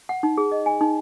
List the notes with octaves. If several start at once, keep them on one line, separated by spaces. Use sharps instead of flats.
F#5
D#4
G#4
D#5
G#5
D#4